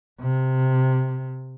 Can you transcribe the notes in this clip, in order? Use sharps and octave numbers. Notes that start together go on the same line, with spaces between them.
C3